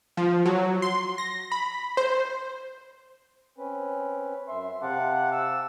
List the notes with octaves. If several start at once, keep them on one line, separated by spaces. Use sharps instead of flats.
F3
F#3
C6
A#6
B5
C5
C4 C#4 B4
F#2 E5 C6
C3 F5 F#5 A5 D6
E6